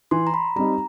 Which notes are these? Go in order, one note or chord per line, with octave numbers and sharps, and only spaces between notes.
E3 C6
A#5
B5
G3 C4 D#4 A#5